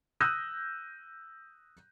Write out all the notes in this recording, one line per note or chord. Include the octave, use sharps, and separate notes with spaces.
D#6 E6 F#6 G6 A#6 D#7